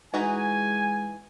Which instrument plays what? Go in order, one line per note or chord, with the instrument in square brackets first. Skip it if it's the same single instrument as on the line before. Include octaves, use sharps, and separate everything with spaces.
[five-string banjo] E3 D#4 F#4 [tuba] G#3 [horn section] G#5